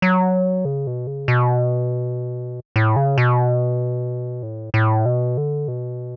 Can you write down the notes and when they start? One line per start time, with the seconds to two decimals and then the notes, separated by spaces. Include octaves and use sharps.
0.02 F#3
0.65 C#3
0.87 B2
1.07 C#3
1.28 B2
2.76 A2
2.96 C#3
3.18 B2
4.43 A2
4.74 A2
5.05 B2
5.38 D3
5.68 B2